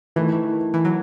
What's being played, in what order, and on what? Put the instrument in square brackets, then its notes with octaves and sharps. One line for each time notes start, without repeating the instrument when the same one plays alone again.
[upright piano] D#3 A3 E4 [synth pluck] E3
[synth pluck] E3
F#3